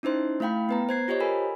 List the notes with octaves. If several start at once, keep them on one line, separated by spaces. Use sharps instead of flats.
C#4 D#4 E4 C5 C6
A3 E4 F5 G5 B5
B3 B4 A#5
C5 G#6 C7
F4 G4 C5 C#5 D#5
A4 A#4 G#5 B5